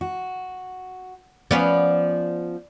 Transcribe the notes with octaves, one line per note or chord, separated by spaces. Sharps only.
F#4
F3 B3 C#4 D5